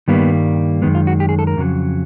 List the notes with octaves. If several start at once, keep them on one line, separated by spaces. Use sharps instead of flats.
G2 D#3 G3 A#3 B3
F#2 D#3 G#3 B3
F4
F#4
G4
G#4
A4
A#4
F2 C#3 F#3